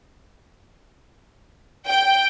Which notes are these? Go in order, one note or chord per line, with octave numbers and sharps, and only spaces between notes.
G5